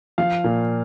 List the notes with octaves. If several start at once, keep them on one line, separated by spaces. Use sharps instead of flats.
F3 F5
A#2